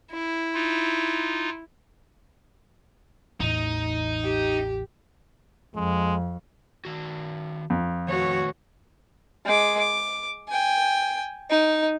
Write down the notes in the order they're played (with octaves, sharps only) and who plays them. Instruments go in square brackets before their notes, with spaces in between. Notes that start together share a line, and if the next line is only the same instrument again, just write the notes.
[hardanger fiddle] E4
[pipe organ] D#4 F4
[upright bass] A1 E2 [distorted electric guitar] D#4
[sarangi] G4
[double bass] F2 [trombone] G#3
[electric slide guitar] D#3 F#4
[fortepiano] F2
[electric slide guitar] D#3 A3 B4 [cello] F#4 C#5
[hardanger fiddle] G#3 D6
D6
G5 G#5
D#4